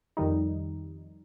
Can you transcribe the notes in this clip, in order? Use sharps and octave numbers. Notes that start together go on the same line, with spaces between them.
F2 D#3 G3 D#4